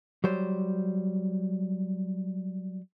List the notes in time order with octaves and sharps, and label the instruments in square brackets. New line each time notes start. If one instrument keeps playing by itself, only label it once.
[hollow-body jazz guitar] F#3 G3 C5